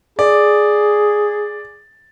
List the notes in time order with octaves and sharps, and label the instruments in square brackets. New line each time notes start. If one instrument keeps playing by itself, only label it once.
[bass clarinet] G#4 [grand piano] D5